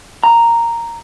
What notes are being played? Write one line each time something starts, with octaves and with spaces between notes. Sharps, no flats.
A#5